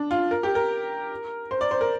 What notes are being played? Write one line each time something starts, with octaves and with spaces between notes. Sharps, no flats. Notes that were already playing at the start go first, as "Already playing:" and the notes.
Already playing: D4
F4
A#4
G4
A#4
C5
D5
C5
A#4